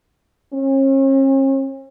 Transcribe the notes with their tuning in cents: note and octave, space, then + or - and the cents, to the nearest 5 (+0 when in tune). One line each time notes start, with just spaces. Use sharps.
C#4 -45